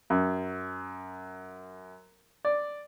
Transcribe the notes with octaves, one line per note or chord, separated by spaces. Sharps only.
F#2
D5